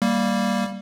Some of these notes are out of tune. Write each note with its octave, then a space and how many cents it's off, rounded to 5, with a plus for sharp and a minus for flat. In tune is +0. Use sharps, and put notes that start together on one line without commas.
G3 +0 A#3 +0